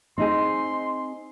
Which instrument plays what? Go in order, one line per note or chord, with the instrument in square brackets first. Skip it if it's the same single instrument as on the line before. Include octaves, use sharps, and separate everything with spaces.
[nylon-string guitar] C4 D#4 G#4 [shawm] C6